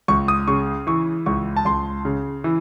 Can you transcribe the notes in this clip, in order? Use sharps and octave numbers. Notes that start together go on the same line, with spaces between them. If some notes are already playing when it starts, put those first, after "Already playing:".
C#2 C#6
D#6
C#3 C#6
E3 C#6
C#2 C#6
A5
C#2 C6
C#3
E3